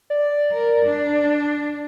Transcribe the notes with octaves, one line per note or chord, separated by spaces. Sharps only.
D5
A#4
D4